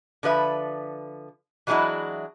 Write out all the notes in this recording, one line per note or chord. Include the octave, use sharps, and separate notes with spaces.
D3 F3 B4 E5
E3 F#3 G#3 D4 E4 F#4